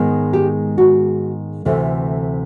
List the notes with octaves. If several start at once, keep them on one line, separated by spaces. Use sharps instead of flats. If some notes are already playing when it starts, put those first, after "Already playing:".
Already playing: G#2 D#3 G#3 B3
G4
F#4
D2 C3 E3 A3